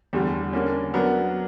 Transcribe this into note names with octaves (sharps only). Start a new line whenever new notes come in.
E2 D3 G3
D3 A#3 C#4
F#3 B3 D4 A#4